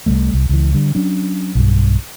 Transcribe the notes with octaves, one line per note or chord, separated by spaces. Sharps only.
C2 G#2 G3 A3
C2
C#2 E3
D3 G3
F#3 C#4 D4
B1 G2